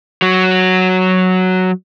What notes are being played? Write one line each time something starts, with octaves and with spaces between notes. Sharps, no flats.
F#3 F#4